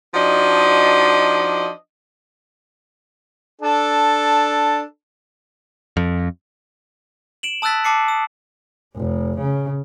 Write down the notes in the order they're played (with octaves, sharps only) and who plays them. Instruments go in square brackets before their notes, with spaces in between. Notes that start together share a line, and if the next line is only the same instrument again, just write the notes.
[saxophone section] F3 D4 D#4 F#4 D#5
[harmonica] D4 A4
[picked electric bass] F2
[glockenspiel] D7 E7 F#7
A5 D#6 E6 F#6 A6 B6
A5 D6 C7 C#7
D#6
[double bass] F1
C#3